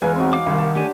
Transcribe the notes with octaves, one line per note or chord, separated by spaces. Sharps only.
E2 G#3 A#4 B4 F5 G#5
F#3 C4 D#4 C5
F5 D6
C2 D#3
A5
A3 D4 G4 G#5